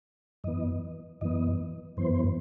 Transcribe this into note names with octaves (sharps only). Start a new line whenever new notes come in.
F#2 E3 B3 D#5
F#2 E3 B3 D#5
F#2 E3 B3 C5